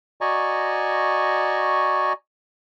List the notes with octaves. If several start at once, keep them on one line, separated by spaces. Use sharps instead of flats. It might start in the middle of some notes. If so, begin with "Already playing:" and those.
F#4 D5 D#5 G#5 A#5 C#6